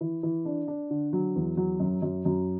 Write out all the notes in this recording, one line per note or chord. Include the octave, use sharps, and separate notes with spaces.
E3
E3
D4
D4
D3
F#3
E2
F#3
F#2
F#2
F#2